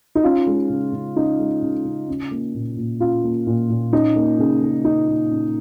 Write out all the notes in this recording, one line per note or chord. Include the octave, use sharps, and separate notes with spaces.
D#4
C#4 F4
G#3
C#3
C#3
C#4 D#4
G#3
C#3
C#3
C#4
A#3
A#2
A#2
C#4 F4
A#3
A#2
A#2
C#4 D#4
A#3
C#3
C#3
C#4 D#4
A#3
C#3